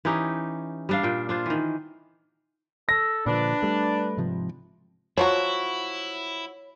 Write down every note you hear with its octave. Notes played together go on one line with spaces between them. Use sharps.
E3 C#4 D#4 G4
G3 D4 F5
A#2 G5
D4 F4 C5
D#3 E3
A4 A#6
A#2 D3 F3 D4 B4
G3 A3
G#2 C3 F3
F3 F#3 E4 F#4 C#5